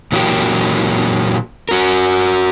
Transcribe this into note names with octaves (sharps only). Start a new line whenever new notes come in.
A#2 E3 F#3 G3 A#3 G4
F#4 A#4